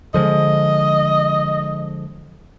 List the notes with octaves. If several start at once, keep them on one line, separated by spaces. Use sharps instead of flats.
D3 F3 G#3 D#5